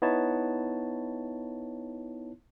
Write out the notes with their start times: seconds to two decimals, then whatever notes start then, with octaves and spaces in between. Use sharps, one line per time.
0.02 B3 D#4 E4 C#5 A5